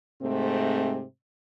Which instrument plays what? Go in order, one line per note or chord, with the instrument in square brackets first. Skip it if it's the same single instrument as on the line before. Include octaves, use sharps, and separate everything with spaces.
[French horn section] G#2 C3 A3 C4